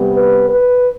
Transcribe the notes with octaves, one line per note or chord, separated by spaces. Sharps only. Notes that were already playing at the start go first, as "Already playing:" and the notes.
Already playing: C3 G3 B3
B4
B4